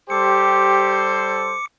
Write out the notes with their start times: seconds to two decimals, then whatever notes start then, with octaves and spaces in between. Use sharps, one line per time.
0.10 G3 G4 A4 C5 D6 C#7